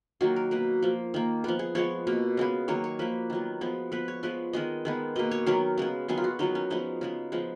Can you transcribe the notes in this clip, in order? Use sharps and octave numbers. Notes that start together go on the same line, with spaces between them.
D#3 F#3 A#3 F#4
A#4
B2 A#3 B4
F3 A#3
D#3 A#3
F3 B3 A#4
G#4
F3 G#3 B3 C#5
B2 A#3
C#3 G#3 B3
D#3 F#3 A#3 C#5
C#5
F3 A#3 B4
D#3 F#3 B3
F3 G#3 B3
F3 B3 B4
C#5
F3 G#3 B3 B4
D#3 G#3 B3 D#5
D#3 G#3 B3
B2 A#3 D#5
C#5
D#3 F#3 B3 A#4
C#3 G#3 B3
D#3 F#3 B3 G#4
F4
F#4
D#3 F#3 B3 D#4
C#4
F3 G#3 B3 D#4
C#3 G#3 B3
F3 G#3 B3